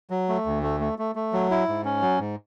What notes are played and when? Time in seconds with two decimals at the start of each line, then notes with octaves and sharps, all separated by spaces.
0.10 F#3
0.29 A3
0.46 D2
0.63 A3
0.80 A3
0.99 A3
1.15 A3
1.33 F#3
1.50 E4
1.68 G#2
1.85 C#4
2.02 F#3
2.19 G#2